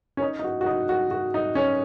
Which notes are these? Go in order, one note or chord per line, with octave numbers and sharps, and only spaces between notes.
C#4
D#4
D#4
F#4
F#4
D#4
F#4
F#4
D#4
C#4